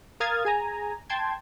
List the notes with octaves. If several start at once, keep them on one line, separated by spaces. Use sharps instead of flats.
A#4 F5 D#6 F6 G#6 A6
G#4 G#5 A#5
G5 A5 C6 G#6